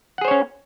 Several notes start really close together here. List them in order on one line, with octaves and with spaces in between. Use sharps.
F#5 G#4 C5 C#5 C#4